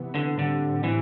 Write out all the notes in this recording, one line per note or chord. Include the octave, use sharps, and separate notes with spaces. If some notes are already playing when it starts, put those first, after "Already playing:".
Already playing: C3 E3 B3
D3
A2 D3 G3 C4
E3